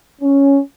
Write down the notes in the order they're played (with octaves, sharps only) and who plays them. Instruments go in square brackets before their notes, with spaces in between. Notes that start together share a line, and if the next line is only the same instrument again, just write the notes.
[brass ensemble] C#4